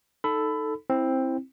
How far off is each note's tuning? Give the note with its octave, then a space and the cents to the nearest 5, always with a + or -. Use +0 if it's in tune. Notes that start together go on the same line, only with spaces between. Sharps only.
D#4 +0 A4 +0 B5 +20
C4 +10 E4 -5